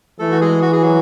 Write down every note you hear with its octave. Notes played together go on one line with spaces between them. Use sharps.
E3 A3 A4
F#4
G#3 G#4
F#4
G#4
F#3 F#4